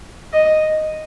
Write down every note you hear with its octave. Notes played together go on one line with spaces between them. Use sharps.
D#5